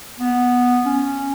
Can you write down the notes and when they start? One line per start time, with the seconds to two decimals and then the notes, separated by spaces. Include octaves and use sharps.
0.20 B3
0.85 C#4